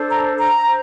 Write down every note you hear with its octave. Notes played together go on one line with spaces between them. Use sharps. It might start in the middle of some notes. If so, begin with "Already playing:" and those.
Already playing: D4 A4 C5
A#5
A#5
C5